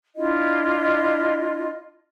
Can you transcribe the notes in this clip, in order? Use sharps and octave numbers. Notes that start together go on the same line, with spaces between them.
D4 E4 F4 D#5